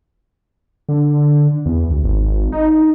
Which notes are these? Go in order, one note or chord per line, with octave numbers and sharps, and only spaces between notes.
D3
E2
D2
G#1
D#4